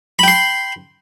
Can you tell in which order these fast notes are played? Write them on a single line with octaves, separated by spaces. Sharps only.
B5 G5 C6